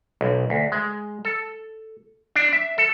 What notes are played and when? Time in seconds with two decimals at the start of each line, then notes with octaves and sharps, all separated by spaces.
0.21 B1
0.50 D2
0.72 G#3
1.25 A4
2.36 D4
2.53 E5
2.78 A4